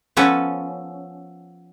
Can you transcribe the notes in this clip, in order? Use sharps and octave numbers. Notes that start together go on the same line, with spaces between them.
F3 B3 C#4 A4 B4